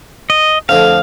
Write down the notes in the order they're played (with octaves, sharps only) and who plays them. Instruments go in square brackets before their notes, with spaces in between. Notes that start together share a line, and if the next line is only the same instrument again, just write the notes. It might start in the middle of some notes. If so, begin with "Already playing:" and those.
[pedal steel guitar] D#5
[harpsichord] F2 D3 F3 A3 [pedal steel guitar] F5